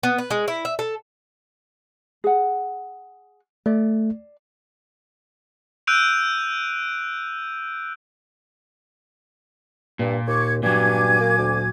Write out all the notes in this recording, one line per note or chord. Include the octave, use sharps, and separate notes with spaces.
B3
B4
G#3
E4
E5
A4
G#4 F#5
A3 D5
E6 F#6 G6 D7 D#7 F7
G2 A#2
D#2 C#6 D6 G#6
G2 A#2 F#3 G#5 D6 G#6
A#3
D2